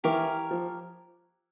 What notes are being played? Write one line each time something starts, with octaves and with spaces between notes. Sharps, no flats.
E3 G4 A#4 C#5 F5
F3